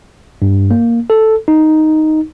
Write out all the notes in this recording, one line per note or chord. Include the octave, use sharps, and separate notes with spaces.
G2
A#3
A4
D#4